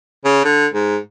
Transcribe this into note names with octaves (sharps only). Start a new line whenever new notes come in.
C#3
D3
G#2